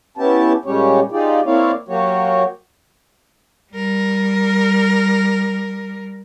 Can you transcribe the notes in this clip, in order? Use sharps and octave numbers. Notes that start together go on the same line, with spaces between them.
B3 C#4 E4 G4 A5
A#2 G3 G#3 C#4 G4 C#5
D#4 F4 G4 G#4 D5
A#3 C4 E4 C#5 D5 F5
F#3 A#3 F#4 G4 C#5
G3 A#4